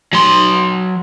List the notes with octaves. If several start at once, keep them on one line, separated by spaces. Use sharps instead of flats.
F#3 C6